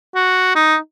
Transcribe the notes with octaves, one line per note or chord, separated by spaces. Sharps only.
F#4
D#4